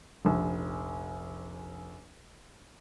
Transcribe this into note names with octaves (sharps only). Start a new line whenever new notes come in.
F1 A#1